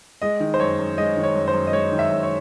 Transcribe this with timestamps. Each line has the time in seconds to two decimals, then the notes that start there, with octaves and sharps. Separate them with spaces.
0.22 G#3 D#5
0.40 D#3
0.54 C5
0.60 F#2 C#5
0.79 F#2
0.98 G#3 D#5
1.17 D#3
1.23 C#5
1.35 F#2
1.48 C5
1.54 F#2
1.67 D#5
1.73 G#3 C#5
1.92 D#3
1.99 E5
2.10 F#2
2.23 C#5